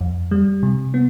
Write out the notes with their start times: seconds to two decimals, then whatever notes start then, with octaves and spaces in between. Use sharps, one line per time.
0.01 F2
0.31 G3
0.63 C3
0.94 B3